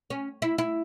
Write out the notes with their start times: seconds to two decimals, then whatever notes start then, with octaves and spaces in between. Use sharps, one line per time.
0.10 C#4
0.42 E4
0.58 E4